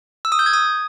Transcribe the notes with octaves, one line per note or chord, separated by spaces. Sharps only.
E6
D#6
G6
G#6
D#6